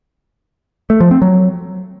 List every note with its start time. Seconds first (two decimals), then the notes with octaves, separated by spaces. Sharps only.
0.90 A3
1.00 F3
1.11 C4
1.22 F#3